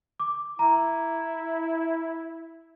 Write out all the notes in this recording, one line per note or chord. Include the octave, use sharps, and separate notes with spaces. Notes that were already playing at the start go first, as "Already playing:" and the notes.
D6
E4 A#5